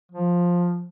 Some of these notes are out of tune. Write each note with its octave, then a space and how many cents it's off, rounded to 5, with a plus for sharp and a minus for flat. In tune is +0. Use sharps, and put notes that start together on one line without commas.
F3 +10